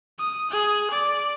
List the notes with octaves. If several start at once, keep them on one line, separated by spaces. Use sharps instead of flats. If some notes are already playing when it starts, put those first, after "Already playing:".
D#6
G#4
D5